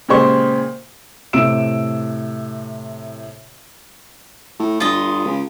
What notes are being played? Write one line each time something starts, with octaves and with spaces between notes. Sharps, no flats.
A#2 C#3 G#3 G4 C5 C#6
A2 C3 E6 D7 E7
A2
G1 F4 D#5
C#2